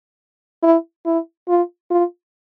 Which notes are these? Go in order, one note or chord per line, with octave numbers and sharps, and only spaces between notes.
E4
E4
F4
F4